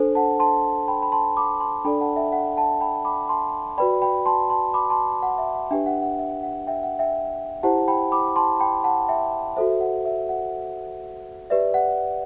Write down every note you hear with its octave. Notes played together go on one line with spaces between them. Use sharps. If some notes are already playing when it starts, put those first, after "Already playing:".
Already playing: D4 A4 C5
F#5 A5
A5 C6
G5 B5
B5
A5 C6
B5 D6
A5 C6
D4 A4 D5 G5 B5
F#5 A5
E5 G5
F#5
F#5 A5
G5 B5
B5 D6
A5 C6
F#4 B4 D5 G5 B5
G5 B5
A5 C6
A5 C6
B5 D6
A5 C6
F#5
E5
F#5
D4 G4 B4 E5 G5
F#5
F#5
E5
F#5
E5 G5
F#5
E5 G5
E4 G4 C5 F#5 A5
G5 B5
B5 D6
A5 C6
G5 B5
F#5 A5
E5 G5
F#4 A4 C5 E5
E5
F#5
E5
F#5
G4 B4 D5 E5
F#5